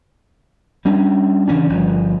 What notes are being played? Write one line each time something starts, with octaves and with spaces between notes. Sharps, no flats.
G3 C#4 D4
C#3 E3 C#4 D4
G1 F3